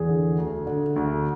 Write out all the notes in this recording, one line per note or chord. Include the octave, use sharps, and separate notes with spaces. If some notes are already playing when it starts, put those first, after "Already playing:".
Already playing: E2 G#4
D3
D2
D3
D2